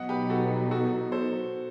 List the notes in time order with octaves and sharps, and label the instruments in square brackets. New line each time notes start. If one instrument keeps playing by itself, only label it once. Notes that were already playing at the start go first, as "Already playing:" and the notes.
Already playing: [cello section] B2 F#3 B3 D#4 [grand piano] D#5 F#5
[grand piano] G4 B4
F#4 A4
F#4 A4
A4 C5